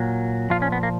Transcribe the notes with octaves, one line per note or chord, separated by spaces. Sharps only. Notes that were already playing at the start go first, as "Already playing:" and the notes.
Already playing: A#2 F#3
A#2 F3 F4
C#4
B3
A#3